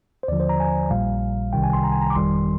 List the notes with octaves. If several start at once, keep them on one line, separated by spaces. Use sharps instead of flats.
C5
D#2 D3 F3 D5
C5
A#5
G#5
A#1 A#2 G3 F5
C2 C3 D#3 G3 G5
G#5
C6
A#5
G#5
A#5
D6
G1 F2 D#3 G3 C6